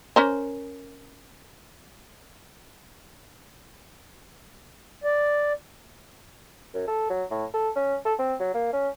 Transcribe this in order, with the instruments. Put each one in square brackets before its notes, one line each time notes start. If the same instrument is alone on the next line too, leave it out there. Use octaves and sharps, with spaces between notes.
[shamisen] C#4 A#4 C5
[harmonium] D5
[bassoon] F#2
A4
F#3
A2
A4
C#4
A4
C4
F#3
A#3
C#4